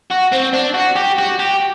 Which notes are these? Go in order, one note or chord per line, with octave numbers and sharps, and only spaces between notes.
F#4
C4
D4
F#4
G4
F#4
G4